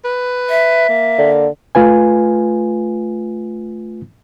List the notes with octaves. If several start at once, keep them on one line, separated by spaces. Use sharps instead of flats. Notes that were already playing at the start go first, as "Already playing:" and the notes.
B4
E5
A#3
D3
A3 F4 B4 G#5